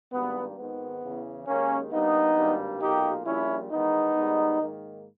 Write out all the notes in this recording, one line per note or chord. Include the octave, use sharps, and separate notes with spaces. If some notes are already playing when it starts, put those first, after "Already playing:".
G#1 G2 G3 A#3 B3
G#1 G#2 D#3 B3
E2 C#3 E3
D#2 D#3 G#3 A#3 C#4
G2 G3 A#3 B3 D#4
G#1 G2 G3 A#3
B1 A#2 A#3 D#4 G4
A#1 A#2 G3 C#4 E4
E2 D#3 G#3 B3 D#4
G#2 D#3 G3
G#2 D#3 A#3